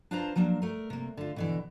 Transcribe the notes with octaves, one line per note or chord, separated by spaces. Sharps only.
D4 F4 B4 C5 A5 A#5
F3 F#3 A#3 D4
A3 A#4
C3 A#3
D3 F4
B2 D3 E3